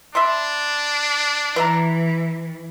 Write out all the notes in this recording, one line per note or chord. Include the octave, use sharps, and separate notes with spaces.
D4 E5 B5 C6
E3 B4 E5 A#5